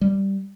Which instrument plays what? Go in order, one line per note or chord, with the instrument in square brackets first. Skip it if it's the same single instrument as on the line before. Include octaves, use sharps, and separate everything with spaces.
[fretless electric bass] G3